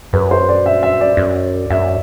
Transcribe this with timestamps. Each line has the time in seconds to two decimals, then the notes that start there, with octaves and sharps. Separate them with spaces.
0.13 F#2 B4
0.31 C5
0.49 D5
0.66 E5
0.83 E5
1.01 D5
1.17 F#2
1.70 F#2 E5